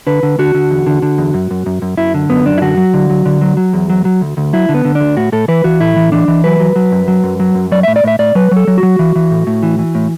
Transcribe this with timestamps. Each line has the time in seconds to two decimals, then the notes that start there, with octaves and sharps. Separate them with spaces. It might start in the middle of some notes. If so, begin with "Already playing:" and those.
0.07 D3 B4
0.23 D3
0.39 D3 F#4
0.54 D3
0.70 E2
0.87 D3
1.02 D3
1.18 E2
1.34 F#2
1.51 F#2
1.66 F#2
1.82 F#2
1.98 F#2 E4
2.14 D3
2.30 F#2 B3
2.46 F#2 D4
2.58 E4
2.62 D3 F#4
2.77 F#3
2.94 D3
3.10 F#3
3.26 D3
3.41 F#3
3.57 F#3
3.73 E2
3.90 F#3
4.05 F#3
4.21 D2
4.37 D2
4.53 F#3 E4
4.69 D3
4.74 B3
4.85 D3
4.95 D4
5.00 D2
5.17 A2 F#4
5.32 A2 A4
5.48 E3 B4
5.64 E3 F#4
5.80 A2 E4
5.97 E3
6.12 E3 D4
6.28 E3
6.44 F#3 B4
6.60 F#3
6.76 F#3
6.92 F#2
7.08 F#3
7.24 F#2
7.40 F#3
7.55 F#2
7.72 F#3 D5
7.83 A2 E5
7.96 D5
8.04 A2 E5
8.19 A2 D5
8.35 F#3 B4
8.51 F#3 A4
8.67 F#3
8.78 F#4
8.83 F#3
8.99 E3
9.16 E3
9.31 A2
9.47 A2
9.63 E3
9.79 E3
9.95 A2